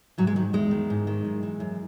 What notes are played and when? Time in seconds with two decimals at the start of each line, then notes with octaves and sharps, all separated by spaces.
0.18 G#2 F#3
0.27 G#3
0.36 D#3 F#3
0.53 E2 G#3
0.71 D#3
0.90 G#2
1.07 D#3
1.24 F#2
1.43 E3
1.60 F#2